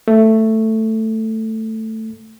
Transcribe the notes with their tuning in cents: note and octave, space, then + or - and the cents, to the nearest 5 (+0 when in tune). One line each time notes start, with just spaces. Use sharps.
A3 +10